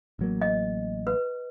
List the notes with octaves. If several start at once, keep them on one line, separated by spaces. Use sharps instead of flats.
A1 F#3 A#3
D#5
B4